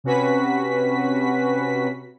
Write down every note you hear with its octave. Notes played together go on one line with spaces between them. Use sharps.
C3 C#4 F#4 B4 B6